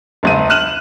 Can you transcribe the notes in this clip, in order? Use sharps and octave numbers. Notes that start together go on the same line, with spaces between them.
E1 C#2 D#7
F6 F#6 D#7 E7 F#7